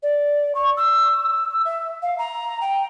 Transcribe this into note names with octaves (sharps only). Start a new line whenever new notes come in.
D5
C#6
E6
E5
F5
A#5
G5